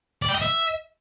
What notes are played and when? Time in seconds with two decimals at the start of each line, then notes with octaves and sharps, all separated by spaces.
0.22 D5
0.29 G5
0.35 D#5
0.42 E5